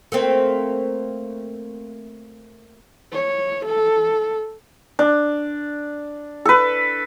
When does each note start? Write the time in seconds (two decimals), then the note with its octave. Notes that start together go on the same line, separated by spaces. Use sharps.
0.12 A3 A#3 C4
3.12 C#5
3.65 A4
4.99 D4
6.45 A4 B4